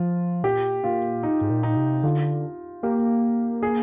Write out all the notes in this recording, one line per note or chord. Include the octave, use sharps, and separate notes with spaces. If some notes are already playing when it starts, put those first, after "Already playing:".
Already playing: F3 F4
A#2 G4
A#2 F4
D#4
G#2
A#2
D#4
C3
D3 F4
A#3 G4
G#4